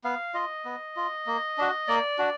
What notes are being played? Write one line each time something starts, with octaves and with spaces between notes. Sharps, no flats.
B3 F5
F4 D#5
B3
F4
A#3
D4 F#4
A#3 D5
D4 F#4